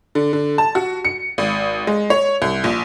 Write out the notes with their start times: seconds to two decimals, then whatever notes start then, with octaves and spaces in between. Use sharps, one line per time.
0.15 D3
0.33 D3
0.58 A5
0.75 F#4
1.05 C#7
1.38 G#1
1.87 G#3
2.10 C#5
2.42 C2
2.64 A#1